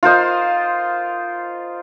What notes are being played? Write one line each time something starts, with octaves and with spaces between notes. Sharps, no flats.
F4 A#4 C5 D#5